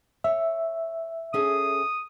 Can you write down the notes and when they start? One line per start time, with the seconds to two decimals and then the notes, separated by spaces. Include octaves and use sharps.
0.24 C#5 E5
1.34 C#4 G#4 A4 D#6